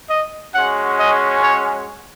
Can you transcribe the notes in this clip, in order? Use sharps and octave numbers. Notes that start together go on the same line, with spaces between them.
D#5
G#3 C#4 F#4 F#5
D#5
C#5